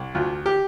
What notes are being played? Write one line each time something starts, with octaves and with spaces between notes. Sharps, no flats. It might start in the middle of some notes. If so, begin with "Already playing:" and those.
Already playing: C2
D2 F4
G4